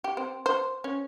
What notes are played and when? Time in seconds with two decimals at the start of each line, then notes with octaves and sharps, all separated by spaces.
0.04 G4
0.17 C4
0.46 C5
0.84 C#4